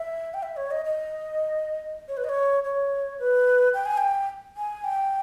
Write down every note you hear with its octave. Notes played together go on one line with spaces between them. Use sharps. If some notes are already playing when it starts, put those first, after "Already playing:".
Already playing: E5
G5
E5
C#5
D#5
D#5
C#5
B4
D#5
C#5
C#5
B4
G5
G#5
G5
G#5
G5